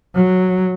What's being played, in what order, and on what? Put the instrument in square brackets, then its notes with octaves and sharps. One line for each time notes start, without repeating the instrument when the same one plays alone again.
[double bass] F#3